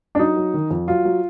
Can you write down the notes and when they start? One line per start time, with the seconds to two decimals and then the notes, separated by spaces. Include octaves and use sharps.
0.15 D4
0.19 F#3 D#4
0.36 F#3
0.54 D#3
0.71 F2
0.88 F#3 F4
1.05 F#3